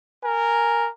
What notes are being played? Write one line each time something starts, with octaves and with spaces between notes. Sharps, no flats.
A#4 G#5